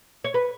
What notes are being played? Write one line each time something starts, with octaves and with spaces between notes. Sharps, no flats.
C#5
B4